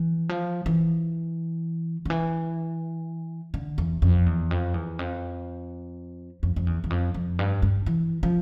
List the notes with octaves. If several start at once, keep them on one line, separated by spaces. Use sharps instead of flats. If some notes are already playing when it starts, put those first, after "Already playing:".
Already playing: E3
F3
E3
D3
E3
D3
E2
F2
E2
F2
E2
F2
F2
F2
E2
E2
F2
F2
G2
G2
E3
F3